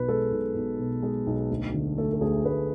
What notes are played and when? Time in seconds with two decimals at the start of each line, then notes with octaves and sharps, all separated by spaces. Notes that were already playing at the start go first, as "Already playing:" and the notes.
Already playing: B1 B2 B4
0.08 G#3 A4
0.32 B1
0.55 B1
0.79 B2
1.02 G#3 G#4
1.27 B1
1.50 D2
1.74 D3
1.97 A3 A4
2.13 A4
2.21 D2 G#4
2.45 D2 B4